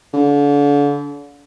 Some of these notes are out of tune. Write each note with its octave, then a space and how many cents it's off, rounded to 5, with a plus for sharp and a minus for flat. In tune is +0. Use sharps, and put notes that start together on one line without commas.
D3 -35